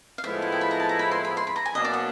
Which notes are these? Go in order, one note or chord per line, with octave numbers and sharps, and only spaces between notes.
F5
A2 F3 G#3 B3 E4 E5
F#5
G5
B5
A#5
A5
A#5
B5
C6
B5
C6
B5
A#5
G#5
B2 F#3 A#3 D4 D#5
D5
F#5